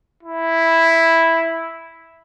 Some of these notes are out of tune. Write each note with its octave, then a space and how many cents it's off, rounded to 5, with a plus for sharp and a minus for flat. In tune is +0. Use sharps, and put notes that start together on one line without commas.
E4 -5